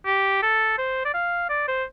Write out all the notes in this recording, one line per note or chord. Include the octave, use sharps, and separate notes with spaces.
G4
A4
C5
D5
F5
D5
C5